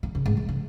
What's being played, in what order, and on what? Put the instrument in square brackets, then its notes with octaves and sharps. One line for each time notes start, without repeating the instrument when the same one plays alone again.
[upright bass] D#3
C#3
G#2
F#2
C#3